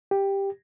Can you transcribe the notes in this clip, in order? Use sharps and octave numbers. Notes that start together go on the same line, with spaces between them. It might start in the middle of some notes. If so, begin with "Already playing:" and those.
G4